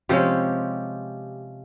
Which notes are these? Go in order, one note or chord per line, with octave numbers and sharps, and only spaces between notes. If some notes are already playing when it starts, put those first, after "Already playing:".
C3 F3 G#3 C#4 G4